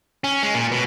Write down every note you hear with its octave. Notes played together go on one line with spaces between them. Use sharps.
C#4
G#3
A#2
B2